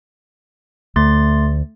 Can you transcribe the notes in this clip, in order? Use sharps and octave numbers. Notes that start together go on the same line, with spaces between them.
D2 A3 C6 A6